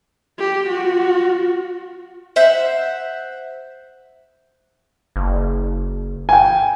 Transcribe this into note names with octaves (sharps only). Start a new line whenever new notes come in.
G4
F4 F#4
C5 E5 F#5
F#1
G5 G#5